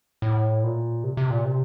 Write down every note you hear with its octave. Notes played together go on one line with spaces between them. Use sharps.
A2
A#2
C3
C3
A#2
C3